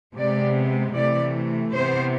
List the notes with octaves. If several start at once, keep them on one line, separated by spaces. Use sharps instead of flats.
C3 G#3 B3 D5
C3 E3 A3 D5
C3 E3 B3 C5